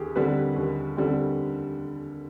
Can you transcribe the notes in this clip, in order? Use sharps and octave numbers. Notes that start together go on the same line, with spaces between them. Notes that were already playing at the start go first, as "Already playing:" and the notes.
Already playing: D#2 G4 G#4
D3 G3 C4 B4
D#2
D3 G3 C4